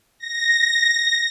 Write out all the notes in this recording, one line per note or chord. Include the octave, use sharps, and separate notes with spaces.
A#6